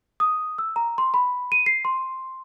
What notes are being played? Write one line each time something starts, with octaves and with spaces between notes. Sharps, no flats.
D#6
E6
A#5
C6
B5
D#7
C7
C6